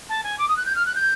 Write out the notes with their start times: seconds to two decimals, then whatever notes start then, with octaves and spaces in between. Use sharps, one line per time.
0.09 A5
0.24 G#5
0.39 D6
0.48 D#6
0.57 F#6
0.66 G6
0.75 F6
0.86 F#6
0.95 G6